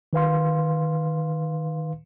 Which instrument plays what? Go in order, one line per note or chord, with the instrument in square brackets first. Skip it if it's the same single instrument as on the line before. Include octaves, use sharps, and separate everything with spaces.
[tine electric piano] D#3 B4 F5 C6